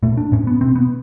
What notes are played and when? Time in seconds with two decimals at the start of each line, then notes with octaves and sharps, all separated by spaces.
0.03 A#2 A3
0.17 D4
0.32 A2 C#4
0.47 B3
0.61 B2 C4
0.76 B3